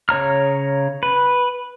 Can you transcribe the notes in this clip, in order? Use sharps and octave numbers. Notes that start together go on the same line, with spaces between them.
C#3 C#5 A#5 F6
B4